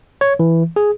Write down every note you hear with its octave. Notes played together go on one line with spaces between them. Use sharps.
C#5
E3
G#4